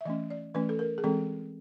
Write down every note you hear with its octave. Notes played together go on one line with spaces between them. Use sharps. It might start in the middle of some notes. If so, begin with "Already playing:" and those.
E5
E3 A3 C#4 D#5
D5
E3 A3 C#4 B4
A4
A#4
G#4
E3 G#3 C4 A4